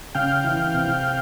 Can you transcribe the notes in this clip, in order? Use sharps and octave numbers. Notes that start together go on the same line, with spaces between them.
C#3 F5 G5
E3
C3